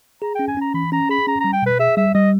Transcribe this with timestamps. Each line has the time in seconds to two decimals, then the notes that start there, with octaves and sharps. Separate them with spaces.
0.22 G#4 A#5
0.35 C#4 G5
0.48 G#5
0.57 C#4 A#5
0.74 E3 B5
0.92 C#4 A#5
1.09 G#4 B5
1.27 C#4 A#5
1.40 G3 A#5
1.53 G5
1.62 B2 B4
1.79 G#4 E5
1.97 G3 E5
2.15 G3 D#5